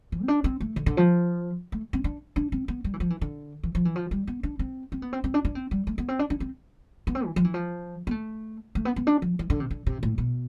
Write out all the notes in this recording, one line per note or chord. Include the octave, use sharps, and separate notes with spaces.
E3
C4
D4
C4
A3
D3
D3
F3
A3
C4
D4
D4
C4
B3
G3
E3
F3
E3
D3
E3
F3
E3
F3
G3
B3
D4
C4
C4
B3
C4
C4
D4
D4
C4
G3
A3
B3
C4
D4
D4
C4
B3
C4
E3
F3
E3
F3
B3
A3
A3
B3
B3
D4
F3
E3
D3
C3
D3
C3
A2
B2